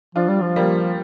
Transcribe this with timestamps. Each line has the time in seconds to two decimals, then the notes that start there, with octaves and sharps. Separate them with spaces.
0.15 F3 D4 F4
0.28 G3
0.41 F3
0.56 G3 A#3